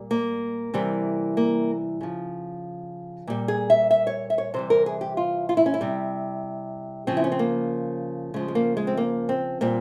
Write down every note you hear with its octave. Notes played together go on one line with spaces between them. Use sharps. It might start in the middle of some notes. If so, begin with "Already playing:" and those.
Already playing: A#2 G3
A#3
C3 E3 G3
A#3
C#3 F3
A#2 G3
G#4
E5
E5
C#5
E5
C#5
C3 E3 G3 C5
A#4
G#4
G4
F4
F4
E4
C#4
E4
C3 G3
C#3 F3 C4
E4
C#4
C4
A#3
C#3 F3 G#3
G#3
A#3
G#3
C4
A#3
C4
A#2 G3 C4